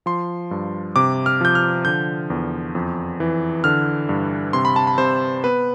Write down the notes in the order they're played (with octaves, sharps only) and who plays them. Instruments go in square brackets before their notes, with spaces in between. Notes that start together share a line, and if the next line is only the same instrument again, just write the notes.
[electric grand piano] F3 C6
G2
C3 D6
F6
F3 G6
F6
D3 G6
E2
F2
E3
D3 F6
G2
C3 C6
B5
A5
B5
C3 C5
B3 B4